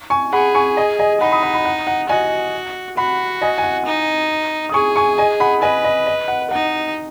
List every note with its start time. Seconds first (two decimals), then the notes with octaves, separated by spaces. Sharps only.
0.10 G#5 C#6
0.33 G#4 F#5 B5
0.55 G#5 C#6
0.77 D#5 G#5
0.99 D#5 G#5
1.21 D#4 F#5 B5
1.32 B5 D#6
1.43 F#5 B5
1.54 F#5 B5
1.65 F#5
1.87 F#5
2.09 F#4 D#5 G#5
2.97 F#4 F#5 B5
3.42 D#5 G#5
3.58 G#5
3.63 F#5
3.86 D#4
4.69 D#6
4.74 G#4 G#5 C#6
4.96 G#5 C#6
5.18 D#5 G#5
5.40 F#5 B5
5.62 B4 D#5 G#5
5.84 D#5
6.07 D#5
6.28 F#5
6.51 D#4 F#5